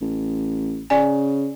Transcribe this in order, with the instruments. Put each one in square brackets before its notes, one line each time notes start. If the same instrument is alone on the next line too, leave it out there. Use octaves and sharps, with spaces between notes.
[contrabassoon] A1
[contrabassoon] C#3 [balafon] D5 G#5